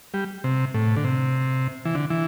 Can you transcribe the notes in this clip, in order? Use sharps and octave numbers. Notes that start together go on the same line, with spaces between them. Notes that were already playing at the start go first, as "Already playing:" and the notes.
G3
C3
A2
D3
C3
E3
D3
E3